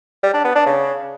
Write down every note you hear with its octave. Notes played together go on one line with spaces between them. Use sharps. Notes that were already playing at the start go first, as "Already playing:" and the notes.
G3
D4
B3
D4
C#3